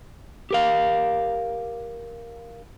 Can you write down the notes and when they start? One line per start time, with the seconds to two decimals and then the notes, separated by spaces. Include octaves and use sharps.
0.51 G4 A#4 F5